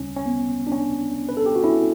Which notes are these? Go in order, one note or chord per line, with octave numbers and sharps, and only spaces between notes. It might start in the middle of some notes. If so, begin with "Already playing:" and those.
Already playing: D2 C#3 G3 C#4
C#4
B3
D4
C#4
B4
A4
G4
F#4
C#4 E4